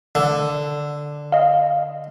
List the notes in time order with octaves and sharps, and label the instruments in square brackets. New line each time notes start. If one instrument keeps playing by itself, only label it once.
[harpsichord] D3
[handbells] D#5 F5